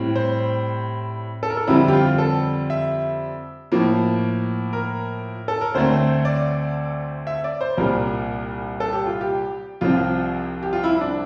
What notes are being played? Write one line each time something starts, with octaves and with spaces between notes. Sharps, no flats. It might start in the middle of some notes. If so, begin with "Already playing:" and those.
Already playing: A2 G3 C4
C5
A4
A#4
A4
F2 D3 G3 C4 E4
G4
F4
A4
E5
A2 F3 A#3
A#4
A4
A#4
D2 D3 A3 C4 C5
D5
E5
D5
C5
C2 A#2 G3 A#4
A4
G4
F4
G4
C2 C3 F3 C4 F4
G4
F4
E4
D4